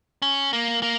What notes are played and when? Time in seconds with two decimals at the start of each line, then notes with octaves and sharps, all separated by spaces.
0.22 C#4
0.53 A#3
0.83 A#3